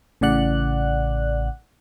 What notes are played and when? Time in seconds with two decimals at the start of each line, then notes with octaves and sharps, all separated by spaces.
0.21 A1 A2 C#3 D5 F#5 F#6